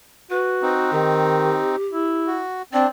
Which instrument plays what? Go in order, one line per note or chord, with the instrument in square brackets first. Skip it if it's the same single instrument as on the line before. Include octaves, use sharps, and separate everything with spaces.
[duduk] F#4 [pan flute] B4
[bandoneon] C4 D#4
[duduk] D#3 [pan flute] G4
[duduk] E4
[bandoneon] F#4
[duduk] C4 [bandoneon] D4 [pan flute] D5